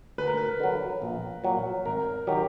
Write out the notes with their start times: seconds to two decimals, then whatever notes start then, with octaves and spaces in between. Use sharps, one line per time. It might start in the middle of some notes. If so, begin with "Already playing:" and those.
0.18 D2 B4
0.27 A#4
0.37 B4
0.60 D3 F#3
1.02 A#1
1.44 A#2 F#3
1.86 G#1 A#4
2.27 D#3 F#3 G4